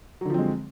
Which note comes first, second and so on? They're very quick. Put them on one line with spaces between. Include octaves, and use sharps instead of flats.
F#3 D3 F3 C4 G#3